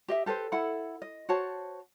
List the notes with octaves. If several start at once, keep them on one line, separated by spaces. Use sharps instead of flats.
G4 D#5 E5
G4 A4 B4 C5
E4 A4 F#5 B5
D#5
F#4 C5 C#5 A5